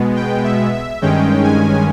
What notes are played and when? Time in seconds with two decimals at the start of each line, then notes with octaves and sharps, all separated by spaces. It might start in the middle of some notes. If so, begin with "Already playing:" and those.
Already playing: B2 G#3 B3
0.16 G5
0.44 E5
0.73 E5
1.02 G2 D#3 G#3 C#4 G5
1.44 G#5